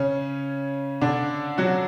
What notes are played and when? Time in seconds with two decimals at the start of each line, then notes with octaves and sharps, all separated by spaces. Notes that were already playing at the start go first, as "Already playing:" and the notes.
Already playing: C#3 C#4
1.01 D3 D4
1.58 F#3 F#4